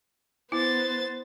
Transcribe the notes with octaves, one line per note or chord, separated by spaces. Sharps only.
B3 E4 C5 A6